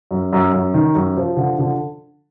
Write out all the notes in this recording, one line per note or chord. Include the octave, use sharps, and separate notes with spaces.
F#2
F#2
F#2
D#3
F#2
F3
D3
D3